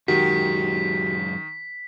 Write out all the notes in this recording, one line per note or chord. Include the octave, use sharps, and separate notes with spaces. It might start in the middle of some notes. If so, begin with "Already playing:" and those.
F#2 D#3 G#3 F#4 G4 B6